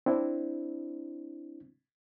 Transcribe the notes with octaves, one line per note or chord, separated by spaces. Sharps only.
C4 D4 E4